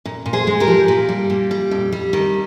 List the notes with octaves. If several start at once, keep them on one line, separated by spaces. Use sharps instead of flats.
A#2
A#2
G#4 C5
G#3
G4 A#4
F3
A#2
G3
A#2
G3
F2
G3
D#3